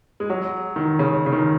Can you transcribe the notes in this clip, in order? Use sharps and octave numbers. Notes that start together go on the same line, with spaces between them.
G#3
F#3
D#3
C#3
C#3
D#3